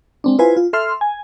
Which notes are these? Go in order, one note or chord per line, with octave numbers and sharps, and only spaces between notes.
G#3 C4 D4
E4 F4 B4 C5 G#5
F4
A4 E5 C6 F6
G#5